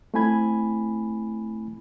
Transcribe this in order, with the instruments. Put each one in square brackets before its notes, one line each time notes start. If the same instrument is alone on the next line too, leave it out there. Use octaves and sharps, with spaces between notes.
[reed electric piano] A3 C4 E4 G#5 B5 G#6